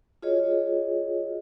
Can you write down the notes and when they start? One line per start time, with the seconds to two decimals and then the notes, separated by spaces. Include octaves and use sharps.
0.22 F4 F#4 G#4 C#5 D#5